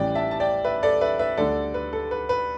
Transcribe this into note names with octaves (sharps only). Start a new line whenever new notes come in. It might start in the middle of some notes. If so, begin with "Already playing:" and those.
Already playing: A1 A2 E3 G3 D5 G5
E5 A5
A5
D5 G5
B4 E5
A4 D5
B4 E5
B4 E5
D2 D3 G3 A4 D5
B4
A4
B4
B4